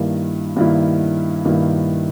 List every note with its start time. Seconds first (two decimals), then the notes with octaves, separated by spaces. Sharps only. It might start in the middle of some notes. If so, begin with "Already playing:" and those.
Already playing: G2 D#3 A#3 E4
0.56 G2 D#3 A#3 E4
1.45 G2 D#3 A#3 E4